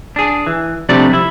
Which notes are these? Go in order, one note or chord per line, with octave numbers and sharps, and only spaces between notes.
D4 G#4
E3
C3 F3 G3 A3 D4 D5
E4